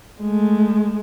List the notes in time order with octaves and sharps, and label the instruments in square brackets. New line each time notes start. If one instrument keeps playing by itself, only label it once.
[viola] G#3 A3